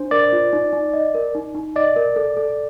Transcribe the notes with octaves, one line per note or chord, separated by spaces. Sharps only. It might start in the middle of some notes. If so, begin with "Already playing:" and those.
Already playing: D4 C5
A#4 D5
F4
D#4
D#4
D#5
A#4
D#4
D#4
D5 D#5
A#4
A4
A4